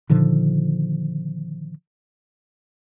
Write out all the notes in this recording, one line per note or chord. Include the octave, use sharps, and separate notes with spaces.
A#2 D3 D#3 F3